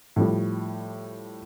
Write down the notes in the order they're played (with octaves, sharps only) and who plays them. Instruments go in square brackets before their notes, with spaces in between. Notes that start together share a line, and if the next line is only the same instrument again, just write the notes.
[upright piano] A2 F3 G3